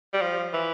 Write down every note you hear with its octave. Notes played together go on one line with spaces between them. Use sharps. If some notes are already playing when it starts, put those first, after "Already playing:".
G3
F3
E3